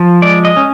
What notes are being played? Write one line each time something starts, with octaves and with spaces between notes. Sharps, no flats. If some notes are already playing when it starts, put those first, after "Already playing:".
Already playing: F3
G#3 D5
D#5
C#4